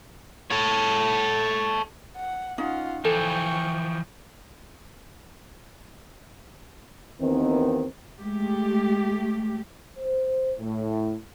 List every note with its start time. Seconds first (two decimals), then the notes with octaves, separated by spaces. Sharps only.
0.51 A4 C#5
2.16 F#5
2.58 C#4 D#4 F4 F#5
3.05 E3 F3 A4 G5 C#6
7.20 D#2 D#3 E3 B3 C4
8.19 G#3 A3 G4
9.97 C5
10.59 A2